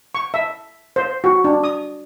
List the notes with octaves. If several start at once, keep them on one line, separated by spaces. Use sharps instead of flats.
C#6
E5
C5
F#4
D4
D#6